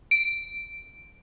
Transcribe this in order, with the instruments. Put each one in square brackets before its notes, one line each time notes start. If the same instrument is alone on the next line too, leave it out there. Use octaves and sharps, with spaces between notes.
[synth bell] D7